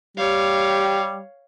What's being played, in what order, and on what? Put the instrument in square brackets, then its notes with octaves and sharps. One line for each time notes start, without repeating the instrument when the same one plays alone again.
[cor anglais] G3 [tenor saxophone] G4 [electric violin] C#5 F5